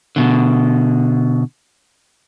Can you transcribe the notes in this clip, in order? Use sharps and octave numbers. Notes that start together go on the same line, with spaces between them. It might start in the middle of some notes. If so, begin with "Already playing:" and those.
B2 D3